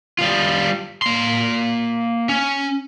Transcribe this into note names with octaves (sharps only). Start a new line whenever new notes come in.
G3 F4
A#3 C6
C#4